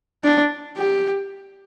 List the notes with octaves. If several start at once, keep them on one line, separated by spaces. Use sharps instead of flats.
D4
G4